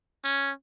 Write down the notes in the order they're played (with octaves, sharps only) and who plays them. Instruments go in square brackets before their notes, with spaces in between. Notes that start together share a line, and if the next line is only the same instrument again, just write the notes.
[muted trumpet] C#4